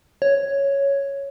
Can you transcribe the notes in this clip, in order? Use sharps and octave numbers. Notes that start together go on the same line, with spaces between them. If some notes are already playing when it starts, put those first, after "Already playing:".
C#5